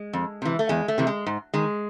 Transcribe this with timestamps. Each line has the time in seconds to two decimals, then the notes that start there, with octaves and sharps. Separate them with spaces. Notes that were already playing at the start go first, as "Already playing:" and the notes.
Already playing: G#3
0.13 F2
0.42 C3 E3
0.59 A3
0.69 E2 G#3
0.88 A3
0.98 C3 E3
1.07 G#3
1.26 G#2
1.54 D#3 G#3